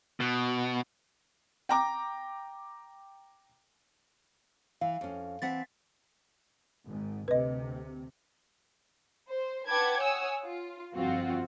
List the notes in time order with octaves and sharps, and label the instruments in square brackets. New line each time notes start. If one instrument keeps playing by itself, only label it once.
[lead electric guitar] B2
[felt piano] G5 A#5 D6
[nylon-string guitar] E3 [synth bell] F5
[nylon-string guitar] F2 C#4
[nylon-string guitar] E3 C4 F#5 [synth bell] A6 B6
[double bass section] G#1 G#2
[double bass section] D2 C3 [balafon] B4 D#5
[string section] C5
B4 F#5 G5 A5 D6 G#6
C#5 F#5 G#5 D#6 E6
F4
G1 F2 C4 F4 F#4